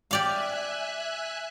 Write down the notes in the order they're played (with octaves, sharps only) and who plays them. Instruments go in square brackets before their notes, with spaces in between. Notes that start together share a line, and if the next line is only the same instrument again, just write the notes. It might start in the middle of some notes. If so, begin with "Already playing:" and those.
[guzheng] G4 D5 F5 [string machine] E5 G#5 F#6